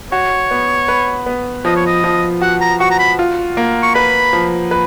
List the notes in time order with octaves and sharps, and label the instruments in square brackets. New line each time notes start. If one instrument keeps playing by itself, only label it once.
[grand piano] F#4 [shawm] C#5
[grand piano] B3
B4
B3
[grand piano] F3 [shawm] D#5
[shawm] C#5
D#5
[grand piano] F3
[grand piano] F#4 [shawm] F#5
[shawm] A#5
[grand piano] F#4 [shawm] C#6
[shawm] A#5
B5
[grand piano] F4
A#3
[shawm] C#6
[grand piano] B4 [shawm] B5
[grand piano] F3
B4